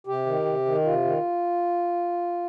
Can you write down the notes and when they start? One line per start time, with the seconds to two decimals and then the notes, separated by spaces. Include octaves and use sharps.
0.07 C3 G4
0.26 D#3
0.45 C3
0.65 D#3
0.84 C3 F4
1.04 D#3